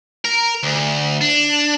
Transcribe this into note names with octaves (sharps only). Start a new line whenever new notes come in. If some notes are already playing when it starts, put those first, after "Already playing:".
A#4
D2
D4